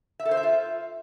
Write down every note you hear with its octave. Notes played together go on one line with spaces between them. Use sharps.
E5
A4
C5
E5
F4